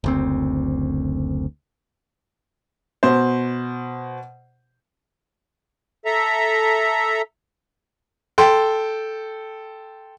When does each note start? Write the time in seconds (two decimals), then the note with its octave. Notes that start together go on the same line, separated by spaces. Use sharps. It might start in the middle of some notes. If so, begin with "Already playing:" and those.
0.04 F#1 D2 C4
3.03 B2 C5
6.05 A4 E5 A#5
8.38 A4 G5 C6